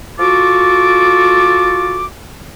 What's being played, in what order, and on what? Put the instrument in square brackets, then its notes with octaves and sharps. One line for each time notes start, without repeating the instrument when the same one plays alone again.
[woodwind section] F4 F#4 A4 D6